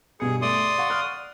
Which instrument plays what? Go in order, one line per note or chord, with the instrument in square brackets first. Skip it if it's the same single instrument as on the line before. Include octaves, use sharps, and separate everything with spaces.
[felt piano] G2 B2 C#7 [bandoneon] G#4
[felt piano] A3 [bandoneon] D5 C6 D#6
[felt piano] F5 F#5 C#6
F6 F#6